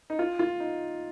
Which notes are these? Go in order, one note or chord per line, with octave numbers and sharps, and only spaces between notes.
D#4
F4
F4
D#4